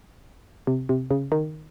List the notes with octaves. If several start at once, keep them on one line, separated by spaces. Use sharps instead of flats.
C3
C3
C#3
D#3